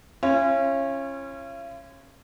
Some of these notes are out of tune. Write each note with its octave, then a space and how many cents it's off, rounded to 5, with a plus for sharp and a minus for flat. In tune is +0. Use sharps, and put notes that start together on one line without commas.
C#4 -20 F4 -45